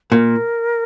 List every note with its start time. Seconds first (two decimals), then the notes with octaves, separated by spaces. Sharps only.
0.11 A#2 A#4